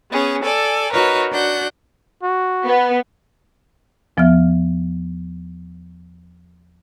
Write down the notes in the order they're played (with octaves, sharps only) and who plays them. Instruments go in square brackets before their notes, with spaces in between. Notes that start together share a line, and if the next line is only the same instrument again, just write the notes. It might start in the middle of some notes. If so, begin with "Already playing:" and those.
[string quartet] B3 C#4 G#4
A4 D5 G#5
D#4 F#4 A#4 B4 C#5
D4 F#4 F#5 G6
[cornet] F#4
[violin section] B3
[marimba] E2 F3 B3 E5 F6